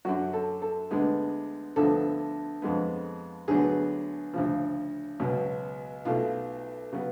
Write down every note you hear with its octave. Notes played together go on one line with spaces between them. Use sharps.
F#2 D3 F#3 F#4
A4
A4
D2 D3 G#3 B3
D2 D3 F3 B3 A4
F2 D3 G#3 B3
D2 D3 F#3 B3 G#4
D2 C#3 F3
C#2 B2 F#3 B3
B1 B2 A3 F4
C#3 F#3 B3